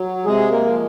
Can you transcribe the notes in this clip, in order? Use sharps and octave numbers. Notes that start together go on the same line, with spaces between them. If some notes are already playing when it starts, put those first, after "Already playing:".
Already playing: F#3
C3 G#3 G#4
A#3 A#4
F3 G#3